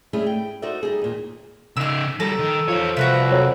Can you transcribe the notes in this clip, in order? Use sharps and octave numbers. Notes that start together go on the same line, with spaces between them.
G3 A3 C#4 D4 E4 G#4
G5
D#4 F#4 A4 C5 D5 E5
G3 D#4 G#4
D#2 A#2
C#3 D#4 E6 F6
F3 G3 A4 A#5
D#3
E2 F3 C#5
C2 F#4 B4 E5
F2 F#3